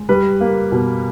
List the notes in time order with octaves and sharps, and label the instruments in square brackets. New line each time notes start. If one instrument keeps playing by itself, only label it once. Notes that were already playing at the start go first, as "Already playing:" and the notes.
Already playing: [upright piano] G#3
G3 B4
A#3
B2